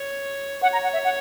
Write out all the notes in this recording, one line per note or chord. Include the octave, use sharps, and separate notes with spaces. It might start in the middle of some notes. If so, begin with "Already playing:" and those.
Already playing: C#5
C#5 F#5
A#5
F#5
E5
F#5